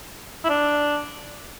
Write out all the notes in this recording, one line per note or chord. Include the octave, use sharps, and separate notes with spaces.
E4
D4